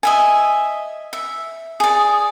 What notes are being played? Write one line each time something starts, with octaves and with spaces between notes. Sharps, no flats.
D#5 E5 G#5
E5
G#4 D5 D#6